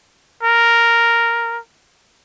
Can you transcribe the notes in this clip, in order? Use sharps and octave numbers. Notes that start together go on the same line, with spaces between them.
A#4